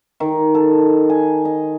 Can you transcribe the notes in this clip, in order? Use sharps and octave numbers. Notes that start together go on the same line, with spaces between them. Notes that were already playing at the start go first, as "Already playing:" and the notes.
D#3
A4
G#5
D#5